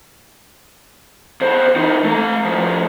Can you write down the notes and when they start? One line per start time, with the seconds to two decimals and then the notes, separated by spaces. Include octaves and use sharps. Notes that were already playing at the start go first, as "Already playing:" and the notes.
1.41 E2 C5
1.76 E3 D#4
2.04 A3 A#5
2.45 A2 F3